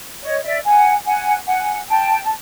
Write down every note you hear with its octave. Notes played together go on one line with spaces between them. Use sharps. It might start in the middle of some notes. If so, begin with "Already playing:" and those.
C#5 D#5
D5 E5
F#5 G#5
F#5 G#5
F#5 G#5
G5 A5
A5